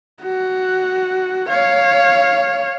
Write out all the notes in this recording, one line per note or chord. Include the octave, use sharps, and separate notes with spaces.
F#4
C#5 F5